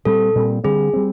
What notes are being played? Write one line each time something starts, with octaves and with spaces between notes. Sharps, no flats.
A#2 G3 C4 A4
A#2 G3 C4
D3 G3 C4 G#4
G3 C4